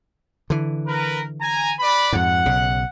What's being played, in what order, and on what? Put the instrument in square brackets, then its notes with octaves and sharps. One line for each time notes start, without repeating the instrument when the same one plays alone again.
[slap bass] D3 E3
[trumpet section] A#4 B4
G#5 A#5
B4 D5 B5
[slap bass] F2 G#2 [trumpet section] F#5
[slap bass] B1 C#3